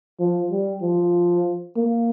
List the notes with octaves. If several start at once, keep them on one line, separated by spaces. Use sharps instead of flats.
F3
G3
F3
A#3